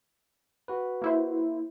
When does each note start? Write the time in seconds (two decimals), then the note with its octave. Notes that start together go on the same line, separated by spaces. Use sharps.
0.68 F#4 B4
1.02 A#3 E4 C5